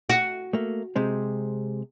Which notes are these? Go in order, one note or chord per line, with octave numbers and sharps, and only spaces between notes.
F#4
A3 A#3
C3 G#3 C4